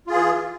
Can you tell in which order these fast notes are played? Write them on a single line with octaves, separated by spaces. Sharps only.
F4 G#4 E3